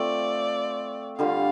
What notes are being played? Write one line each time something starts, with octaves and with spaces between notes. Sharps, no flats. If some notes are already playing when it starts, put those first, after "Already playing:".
Already playing: A3 C4 F4 D5
D3 G3 F4 F5